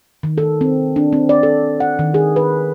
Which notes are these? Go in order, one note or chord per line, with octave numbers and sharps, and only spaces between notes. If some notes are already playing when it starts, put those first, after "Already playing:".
D#3
A4
C4
D4
C4
D5
A4
F#5
D#3
G#4
B4